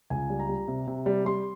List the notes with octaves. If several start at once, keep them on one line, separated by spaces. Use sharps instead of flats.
C#2 G#5
G3
A#5
G3
C3
C3
G3
G3 C6